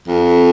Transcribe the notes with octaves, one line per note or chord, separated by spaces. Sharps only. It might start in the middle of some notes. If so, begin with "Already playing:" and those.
F2